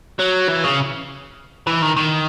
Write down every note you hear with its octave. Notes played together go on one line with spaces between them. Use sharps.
F#3
E3
C#3
E3
D#3
D#3